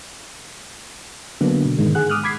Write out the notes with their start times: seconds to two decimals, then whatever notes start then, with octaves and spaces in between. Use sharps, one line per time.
1.41 D3 F#3 A#3 B3 D4
1.65 B2
1.78 G#2 D#3 G#3
1.95 G#4 F#5 F#6
2.10 D6 D#6 F6 F#6
2.24 B5 D6 G#6 B6 C7